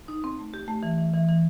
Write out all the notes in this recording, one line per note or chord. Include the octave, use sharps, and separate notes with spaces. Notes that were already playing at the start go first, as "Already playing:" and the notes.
D#4
C4
A3
G4
A3
E3
E3
E3
E3